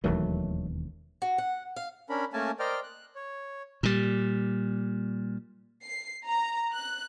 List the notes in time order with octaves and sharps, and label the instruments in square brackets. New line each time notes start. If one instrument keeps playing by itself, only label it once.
[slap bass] E1 D#2 E3 [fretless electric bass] D#3 F#3 A3
[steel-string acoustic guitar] F#4
F#5
F5
[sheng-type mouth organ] C#4 D4 A#4 B5
A3 A#3 C#4 A#4 G#5 A5
A#4 C5 D5 D#5 G5 F6
F#6
C#5
[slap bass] A#2 G3
[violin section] C7
A#5
F#6